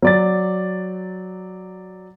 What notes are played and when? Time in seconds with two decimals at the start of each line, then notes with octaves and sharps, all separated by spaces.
0.02 F#3 D5 A6